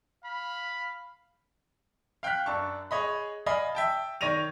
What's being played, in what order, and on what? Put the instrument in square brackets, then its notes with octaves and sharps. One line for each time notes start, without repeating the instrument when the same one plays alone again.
[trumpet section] F5 B5
[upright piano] F5 G5 F6 F#6 B6
F#2 D4 A5 C#6
G#4 C#5 D#5 B5
D5 D#5 F5 G#5 B5
E5 G5 A5
D#3 C#5 D5 A#6 D#7 F7